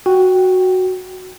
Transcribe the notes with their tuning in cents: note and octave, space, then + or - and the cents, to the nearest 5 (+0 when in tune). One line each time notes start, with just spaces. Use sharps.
F#4 +0 G5 +0